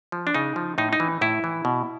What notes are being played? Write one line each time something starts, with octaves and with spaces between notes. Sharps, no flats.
F3
D4
C#3 D#4
F3
A2 D#4
D#4
E3
A2 E4
E3
B2